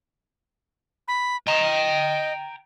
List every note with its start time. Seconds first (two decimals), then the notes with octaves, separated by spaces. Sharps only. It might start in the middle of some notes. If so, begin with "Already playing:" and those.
1.08 B5
1.47 D#5 G5 A#5